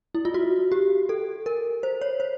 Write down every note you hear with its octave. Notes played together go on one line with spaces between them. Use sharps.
E4
F4
F#4
G4
A4
A#4
C5
C#5
C5